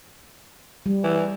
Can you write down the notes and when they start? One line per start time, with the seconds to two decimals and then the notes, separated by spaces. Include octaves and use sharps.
0.86 G3
1.04 E3